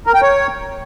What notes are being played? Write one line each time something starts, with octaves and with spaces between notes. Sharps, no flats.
A#4
G5
C#5